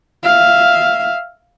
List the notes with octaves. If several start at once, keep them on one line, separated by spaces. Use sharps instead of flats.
E5 F5